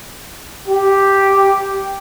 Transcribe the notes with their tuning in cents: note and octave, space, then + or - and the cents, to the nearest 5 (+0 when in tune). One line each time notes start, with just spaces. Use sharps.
G4 +0